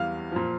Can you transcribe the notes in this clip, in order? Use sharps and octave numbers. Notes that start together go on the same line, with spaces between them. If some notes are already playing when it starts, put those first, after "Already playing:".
Already playing: E2 E3 G3 F5
A#2 F3